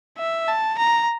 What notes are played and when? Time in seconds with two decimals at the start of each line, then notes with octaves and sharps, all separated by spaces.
0.18 E5
0.48 A5
0.78 A#5